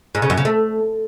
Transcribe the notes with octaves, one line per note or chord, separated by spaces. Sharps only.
G#2
C#3
F#2
C#3
A3